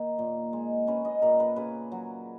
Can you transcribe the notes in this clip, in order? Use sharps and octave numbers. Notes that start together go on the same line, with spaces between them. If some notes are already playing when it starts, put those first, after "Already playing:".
Already playing: D#3 A#3 D#5
A#2
G#3
C#4 B4
D#5
A#2 A#4
B4
C#3 B4
F#3